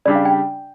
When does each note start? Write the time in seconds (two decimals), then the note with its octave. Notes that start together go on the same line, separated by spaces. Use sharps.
0.05 C#3 G3 D4 G4 D5
0.15 F5
0.25 G5